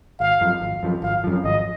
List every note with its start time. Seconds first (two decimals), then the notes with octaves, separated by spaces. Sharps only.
0.20 G#1 F5
0.41 F#2 F3
0.62 G#1
0.83 F#2 F3
1.03 G#1 F5
1.24 F#2 F3
1.44 G#1 D#5